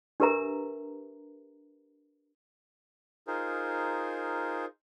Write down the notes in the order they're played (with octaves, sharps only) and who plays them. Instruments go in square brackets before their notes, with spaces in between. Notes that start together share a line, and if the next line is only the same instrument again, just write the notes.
[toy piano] D4 G4 A#4 B4 E5 A#5
[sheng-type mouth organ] D#4 F4 G#4 A#4 C5